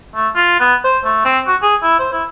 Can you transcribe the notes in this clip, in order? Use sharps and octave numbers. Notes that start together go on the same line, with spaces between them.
A3
F4
B3
C5
A3
C4
F#4
G#4
E4
C5
E4